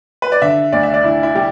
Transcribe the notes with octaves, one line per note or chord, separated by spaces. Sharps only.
B4
D5
D3 E5
D2 D5
E5
D5
D3 E4
E4
G3 G4